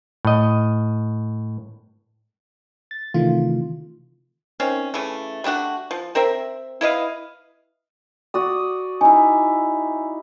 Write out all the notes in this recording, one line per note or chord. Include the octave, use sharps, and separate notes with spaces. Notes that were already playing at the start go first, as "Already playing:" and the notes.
A2 D#5
A6
C3 D#3 E3 A3 F4
D#3 C4 C#4
C#3 E3 A3
G3 A3 D4 F#4
F3
C4 A#4 C5 E5
E4 B4 D#5 F5
F#4 D5 D#6
D#4 E4 G#5